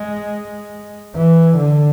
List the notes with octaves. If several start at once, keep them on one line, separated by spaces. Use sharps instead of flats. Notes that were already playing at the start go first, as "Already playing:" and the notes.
Already playing: G#3
E3
D3